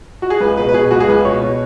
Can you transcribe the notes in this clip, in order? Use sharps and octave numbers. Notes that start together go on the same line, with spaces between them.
F#4
G#4
C#2 B4
B2 B4
B4
B2 G#4
C#2 F#4
G#4
C#2 B4
B2 C#5
B2